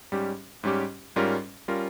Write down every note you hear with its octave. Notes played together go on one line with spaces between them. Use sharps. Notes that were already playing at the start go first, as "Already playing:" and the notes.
G#2 G3 C#4 G4
G#2 G3 C#4 G4
G#2 G3 C#4 F4 A#4
G3 C#4 F4 A#4